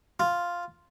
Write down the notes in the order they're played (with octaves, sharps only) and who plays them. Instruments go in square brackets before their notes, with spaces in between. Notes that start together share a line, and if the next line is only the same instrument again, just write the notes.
[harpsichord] F4